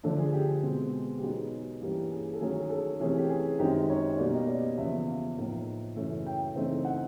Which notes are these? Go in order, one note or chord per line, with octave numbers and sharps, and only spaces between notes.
D3 F3 A3 D4 A4
G#4
G4
B2 G#3 C4
G4
B2 F#3 B3 D#4 G#4
G2 E3 G3 A#3 C#4
G#4
A4
D#3 F#3 A3 C#4 G#4
G#4
A4
C3 E3 A3 C#4 G#4
G4
G#4
F#2 D#3 G#3 C4 D#4 G4
C#5
B2 G3 A#3 C#4 D5
D#5
D5
E2 C#3 F3 E5
F5
A2 F3 A#3 D#4
F#2 C#3 E3 A3 C#4
G5
C#3 E3 A3 C4 D#4
F#5